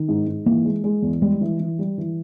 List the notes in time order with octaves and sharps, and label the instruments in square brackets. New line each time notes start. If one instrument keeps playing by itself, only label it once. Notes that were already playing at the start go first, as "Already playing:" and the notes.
Already playing: [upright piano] D#3
G#2
G#2
[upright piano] E3 [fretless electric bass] A#3
[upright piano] G#3
G#3
E2
[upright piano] G3 [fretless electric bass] G#3
[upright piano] E3
E3
G3
E3